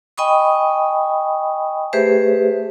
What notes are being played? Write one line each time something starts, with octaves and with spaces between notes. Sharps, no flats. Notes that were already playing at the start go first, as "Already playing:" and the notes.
D#5 G5 G#5 B5 C#6 D#6
A3 G4 G#4 B4 C5 E5